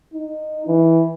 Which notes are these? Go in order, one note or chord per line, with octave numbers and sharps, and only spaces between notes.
D#4
E3